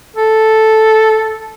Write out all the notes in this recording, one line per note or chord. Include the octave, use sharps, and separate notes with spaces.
A4